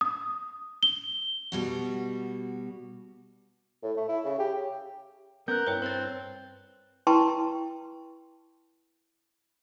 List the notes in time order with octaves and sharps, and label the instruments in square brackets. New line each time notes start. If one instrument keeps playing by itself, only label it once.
[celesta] D#6
G7
[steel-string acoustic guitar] B2 G3 F#4
[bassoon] A2
A3
E4
C#3
G4
[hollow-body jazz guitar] B3 C#4 [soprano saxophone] A#4 [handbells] F#6 G6
[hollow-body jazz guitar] G2 E4 [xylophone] B4 C#5 G5
[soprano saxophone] C4 [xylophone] A#4 C5 A6
[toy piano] E4 B4 G5 A5 C6 C#6